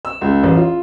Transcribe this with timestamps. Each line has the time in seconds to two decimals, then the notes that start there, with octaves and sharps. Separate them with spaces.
0.05 E6
0.21 C#2
0.43 A1
0.56 F4